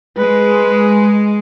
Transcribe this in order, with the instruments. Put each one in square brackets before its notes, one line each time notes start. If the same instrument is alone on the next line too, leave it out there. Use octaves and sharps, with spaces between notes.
[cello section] G#3 [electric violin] B4